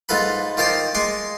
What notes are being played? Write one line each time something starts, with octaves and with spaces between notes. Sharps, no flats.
G#2 F4 A4 B4 B5
D#3 F4 C5 A5 C6 D6
G#3 C6 D6